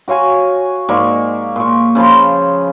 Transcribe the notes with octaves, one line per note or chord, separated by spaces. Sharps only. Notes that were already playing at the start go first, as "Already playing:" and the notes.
F#4 C#5 F5 G#5
G#2 A#3 D5 C#6
A#2 C#6
C#3 F3 B5 C6